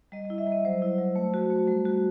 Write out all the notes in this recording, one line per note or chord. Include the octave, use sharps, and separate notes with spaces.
G3 D#5
D#5
E4
E5
G3
D#5
F#3 C5
E4
F#3
A3
F#4
A3
G3
F#4